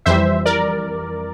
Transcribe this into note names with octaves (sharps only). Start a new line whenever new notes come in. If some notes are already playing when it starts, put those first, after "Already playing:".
F2 E3 G3 C5 E5
A#4 D5